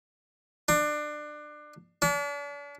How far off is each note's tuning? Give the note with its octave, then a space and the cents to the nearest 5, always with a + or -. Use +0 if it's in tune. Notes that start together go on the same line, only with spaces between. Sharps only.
D4 +25
D4 -40